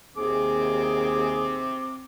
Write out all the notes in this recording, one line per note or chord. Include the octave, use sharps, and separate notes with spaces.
D#2 C4 G#4 D6